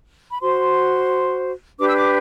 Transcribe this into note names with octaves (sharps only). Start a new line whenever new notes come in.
B5
F#4 C5 C6
D4 G4 B4 D6
E6
D6